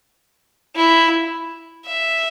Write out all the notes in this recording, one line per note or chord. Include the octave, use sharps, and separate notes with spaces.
E4
E5